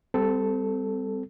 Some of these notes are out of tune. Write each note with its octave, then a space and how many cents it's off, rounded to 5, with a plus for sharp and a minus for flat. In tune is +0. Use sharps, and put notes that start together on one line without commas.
G3 +15 C4 -25 A4 +0